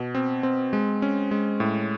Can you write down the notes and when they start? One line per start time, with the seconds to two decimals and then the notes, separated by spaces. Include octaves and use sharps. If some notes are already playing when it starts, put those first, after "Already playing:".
Already playing: B2
0.15 C4
0.43 C4
0.73 G#3
1.02 C#4
1.31 G#3
1.60 A2